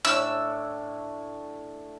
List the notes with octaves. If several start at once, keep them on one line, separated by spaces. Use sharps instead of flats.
A2 D4 C#6 E6